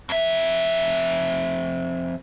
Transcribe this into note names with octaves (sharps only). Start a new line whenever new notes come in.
F2 E5